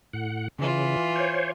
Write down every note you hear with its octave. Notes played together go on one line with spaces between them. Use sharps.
A2 F#5
C#3 E3 F4
C5 C#5